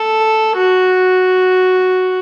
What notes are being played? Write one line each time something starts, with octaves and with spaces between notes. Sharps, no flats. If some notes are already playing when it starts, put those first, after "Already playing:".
Already playing: A4
F#4